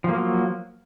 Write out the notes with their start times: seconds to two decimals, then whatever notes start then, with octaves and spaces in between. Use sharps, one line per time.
0.04 F3
0.09 A#3
0.14 F#3